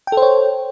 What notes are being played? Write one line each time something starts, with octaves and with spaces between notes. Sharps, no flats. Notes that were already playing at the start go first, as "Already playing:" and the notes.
A4 C5 C#5 G5